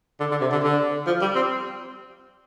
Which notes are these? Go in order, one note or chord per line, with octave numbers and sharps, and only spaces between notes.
D3
D3
C3
D3
D3
F3
G3
C4